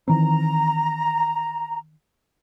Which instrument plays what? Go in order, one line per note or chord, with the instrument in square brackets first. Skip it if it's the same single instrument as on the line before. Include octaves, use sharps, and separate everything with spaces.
[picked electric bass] D#3 E3 C4 [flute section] A#5